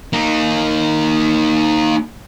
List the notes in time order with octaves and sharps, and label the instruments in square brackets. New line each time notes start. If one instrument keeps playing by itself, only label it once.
[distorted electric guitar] A#3 D#4